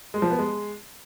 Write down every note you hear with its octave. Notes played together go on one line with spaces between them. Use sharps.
G#3
F3
B3
G#3